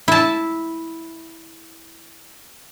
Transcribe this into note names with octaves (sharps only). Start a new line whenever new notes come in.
E4 A5